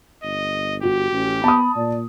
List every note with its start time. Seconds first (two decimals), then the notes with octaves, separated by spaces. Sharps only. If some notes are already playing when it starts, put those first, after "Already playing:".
0.23 G1 D#5
0.83 F#4 G4
1.12 A1 C#4
1.44 B3 A5 B5 D#6
1.76 A#2 D5